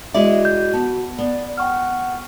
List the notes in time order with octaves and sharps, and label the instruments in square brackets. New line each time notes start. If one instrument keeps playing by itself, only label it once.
[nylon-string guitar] G#3 E4 D5 [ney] F#4 [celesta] E5
[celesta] G6
[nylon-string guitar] B3 [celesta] A5
[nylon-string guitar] B3 [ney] D5
[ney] F#5 [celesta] G5 C#6 F6